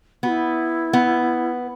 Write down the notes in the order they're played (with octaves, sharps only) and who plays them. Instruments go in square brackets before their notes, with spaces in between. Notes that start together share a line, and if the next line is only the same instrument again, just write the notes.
[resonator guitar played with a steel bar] B3 [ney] F#4
[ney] E4
[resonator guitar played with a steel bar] B3